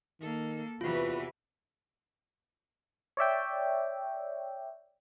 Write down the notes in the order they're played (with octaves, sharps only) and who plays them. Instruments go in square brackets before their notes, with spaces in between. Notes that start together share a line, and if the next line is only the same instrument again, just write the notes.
[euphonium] D#3 [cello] A#3 A4
[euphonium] E2 [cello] C3 E3 [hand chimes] F4 [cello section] F#4 B4
[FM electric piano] C#5 D5 E5 G5